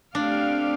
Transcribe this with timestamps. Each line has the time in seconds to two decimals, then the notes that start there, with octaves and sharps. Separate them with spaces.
0.15 A3 C4 D4 G4 D5 F5